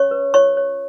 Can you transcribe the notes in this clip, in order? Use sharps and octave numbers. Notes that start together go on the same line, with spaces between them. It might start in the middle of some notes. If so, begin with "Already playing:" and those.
Already playing: C#4 C#5 C#6
B4
F4 C#5 C#6
C#5